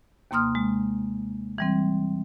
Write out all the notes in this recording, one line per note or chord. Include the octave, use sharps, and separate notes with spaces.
D#2 C3 A#3 C6 D#6 F6
G#3
E3 G3 C4